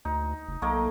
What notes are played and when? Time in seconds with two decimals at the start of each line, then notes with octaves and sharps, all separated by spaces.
0.05 D2 D#4
0.48 F1
0.62 B1 A3 A#3 D#5